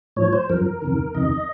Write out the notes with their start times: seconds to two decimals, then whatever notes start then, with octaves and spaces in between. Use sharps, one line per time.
0.17 A2 F3 C#5
0.33 C5
0.50 F#2 F3 A#4
0.82 F2 C3 D#3
1.14 F2 C3 D#3 D#5